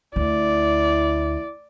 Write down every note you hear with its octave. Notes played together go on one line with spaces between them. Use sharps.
D2 E4 D5